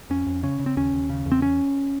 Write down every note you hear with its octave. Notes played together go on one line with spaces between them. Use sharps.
F2 C#4
F2
C#3 C#4
C#3
C4
D#2 C#4
D#2
C#3
E2
C4
C#4